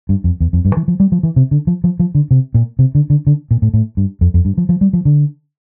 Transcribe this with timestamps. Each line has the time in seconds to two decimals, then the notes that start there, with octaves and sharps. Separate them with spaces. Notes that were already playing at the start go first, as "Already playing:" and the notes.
0.09 G2
0.24 F2
0.40 E2
0.53 F2
0.65 G2
0.77 E3
0.88 F3
1.00 G3
1.12 F3
1.23 E3
1.36 C3
1.51 D3
1.67 F3
1.84 F3
2.00 F3
2.15 D3
2.31 C3
2.54 A#2
2.79 C3
2.95 D3
3.10 D3
3.27 D3
3.51 A#2
3.62 A2
3.74 A2
3.97 G2
4.21 F2
4.34 F2
4.45 G2
4.58 F3
4.69 F3
4.81 G3
4.93 F3
5.05 D3